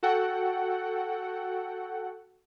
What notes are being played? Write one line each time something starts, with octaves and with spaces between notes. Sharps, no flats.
F#4 A4 F#5 G5